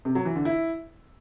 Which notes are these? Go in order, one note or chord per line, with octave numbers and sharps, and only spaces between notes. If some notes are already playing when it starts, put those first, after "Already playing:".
C3
F#3
E3
D3
E4